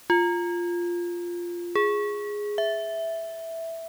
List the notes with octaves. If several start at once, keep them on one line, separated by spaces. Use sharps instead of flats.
F4
G#4
E5